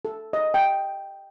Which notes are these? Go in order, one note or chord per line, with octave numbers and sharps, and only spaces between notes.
A4
D#5
G5